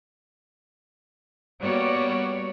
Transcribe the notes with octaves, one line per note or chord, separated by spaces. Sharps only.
G3 A#3 B3 F#4 C#5 D5